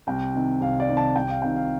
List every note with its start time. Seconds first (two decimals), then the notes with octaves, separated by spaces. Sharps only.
0.07 C2 G5
0.34 C3 D#3
0.61 C2 F5
0.80 D5
0.89 C3 D#3
0.97 A5
1.16 C2 G5
1.29 F5
1.42 C3 D#3 G5
1.56 F5